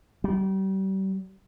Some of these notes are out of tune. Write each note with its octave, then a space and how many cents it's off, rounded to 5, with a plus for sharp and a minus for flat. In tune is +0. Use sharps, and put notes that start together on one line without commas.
G3 -35